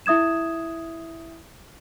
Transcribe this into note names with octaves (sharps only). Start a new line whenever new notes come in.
E4 E5 D#6 G#6 E7